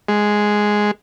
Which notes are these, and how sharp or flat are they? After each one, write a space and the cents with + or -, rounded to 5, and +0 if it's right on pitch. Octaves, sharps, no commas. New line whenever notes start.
G#3 +0